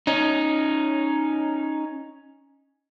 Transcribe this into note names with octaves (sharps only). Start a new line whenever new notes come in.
C#4 D#4